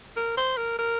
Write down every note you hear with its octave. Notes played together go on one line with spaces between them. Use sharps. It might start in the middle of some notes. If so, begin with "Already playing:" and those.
A#4
C5
A#4
A#4